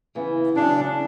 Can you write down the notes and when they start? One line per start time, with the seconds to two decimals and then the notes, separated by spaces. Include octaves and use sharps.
0.15 C#3 E3 B3
0.56 E2 C#3 F#3 D4